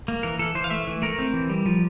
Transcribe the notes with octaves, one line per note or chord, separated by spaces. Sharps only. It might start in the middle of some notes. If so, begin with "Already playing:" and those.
A#3
E3 A#4
E3 A4
E3 C5
F5
A3 E5
E3
A3 A#4
C4
E3
G3
F3